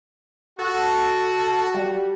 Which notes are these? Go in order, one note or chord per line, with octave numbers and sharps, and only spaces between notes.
F#4 A4
G3